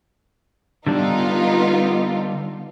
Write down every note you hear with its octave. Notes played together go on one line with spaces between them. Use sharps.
D3 G3 B3 D4 D#4 F4